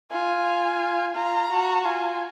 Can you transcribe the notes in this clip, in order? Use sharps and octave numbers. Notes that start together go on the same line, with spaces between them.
F4 G#5
F4 A#5
F#4
F4 G#5